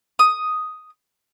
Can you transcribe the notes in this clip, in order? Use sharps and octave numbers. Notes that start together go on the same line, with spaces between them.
D#6